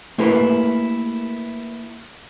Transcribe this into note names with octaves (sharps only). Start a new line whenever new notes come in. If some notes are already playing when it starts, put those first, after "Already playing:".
A3 A#3 E4 G4 A#4 B4